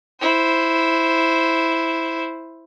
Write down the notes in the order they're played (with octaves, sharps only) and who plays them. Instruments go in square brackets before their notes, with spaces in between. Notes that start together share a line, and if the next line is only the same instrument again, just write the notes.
[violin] E4 C5